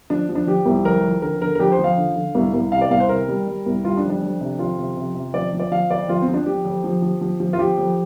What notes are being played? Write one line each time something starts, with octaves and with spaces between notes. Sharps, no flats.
F3 D4
F3
D4
F3 G4
C2
F2 A#4
F2
D3 A#4
D3 A#4
A#4
F2 G4
C5
F3
F5
D3
D3
C2
C2
C3 F5
D5
C2 F5
C5
C3 A#4
G3
G3
C2
G3 F4
D4
F2
D4
F2
C3
F2 F4
C3
C3
C3
F3 D5
F3
D5
F3 F5
F2 D5
F2 F4
C4
F3
D4
F3 G4
F2
F3
F3
F3
F3
F4
F3 G4
F2